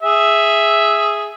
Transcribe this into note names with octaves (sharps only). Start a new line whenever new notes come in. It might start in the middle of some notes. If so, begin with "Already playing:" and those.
G#4 E5